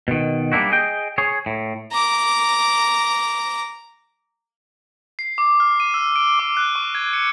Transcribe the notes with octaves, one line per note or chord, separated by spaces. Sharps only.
B2 D#3
G3 A#3 D4 E4 F#4
G#4 D#5 G5
G#4 C#5
A2
A#5 D6
C7
D6
F6
D#7
E6
D7
D6
F#6
C#6
G#6
C#7